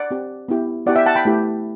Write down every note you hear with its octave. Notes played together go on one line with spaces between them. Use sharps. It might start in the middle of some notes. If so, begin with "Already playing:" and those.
Already playing: D5 F#5
C4 G4
B3 E4 G4
B3 E4 G4 D5 F#5
E5 G5
F#5 A5
G5 B5
A3 E4 G4